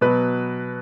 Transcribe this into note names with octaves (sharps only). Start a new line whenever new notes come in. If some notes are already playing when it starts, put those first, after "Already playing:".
B2 F#3 B4